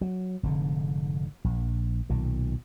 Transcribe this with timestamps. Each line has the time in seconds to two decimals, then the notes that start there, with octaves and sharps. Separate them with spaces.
0.01 F#3
0.43 F1 G#2 D3
1.44 A#1
2.10 B1 A#2 D#3